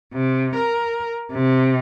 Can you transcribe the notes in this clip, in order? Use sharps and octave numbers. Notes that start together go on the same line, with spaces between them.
C3
A#4
C3